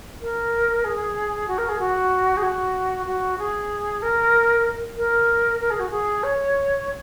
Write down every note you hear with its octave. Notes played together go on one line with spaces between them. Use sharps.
A#4
G#4
F#4
A#4
G#4
F#4
G#4
F#4
F#4
G#4
A#4
A#4
A#4
G#4
F#4
G#4
C#5